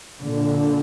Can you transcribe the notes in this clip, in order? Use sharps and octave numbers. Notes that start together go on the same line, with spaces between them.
A#2 D3